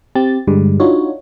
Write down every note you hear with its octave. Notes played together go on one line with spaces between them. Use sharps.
C4 G4 A6
G2 D3 G3 G#3
D4 D#4 F4 F#4 C#5